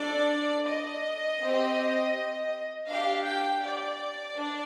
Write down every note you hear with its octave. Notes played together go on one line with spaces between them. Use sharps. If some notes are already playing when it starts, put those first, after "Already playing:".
Already playing: D4 A4 D5
D#5
C4 G4
D4 G4 F5
G5
D5
D4